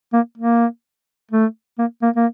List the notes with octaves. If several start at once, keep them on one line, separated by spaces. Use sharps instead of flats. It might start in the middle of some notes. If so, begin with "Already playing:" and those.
A#3
A#3
A3
A#3
A#3
A#3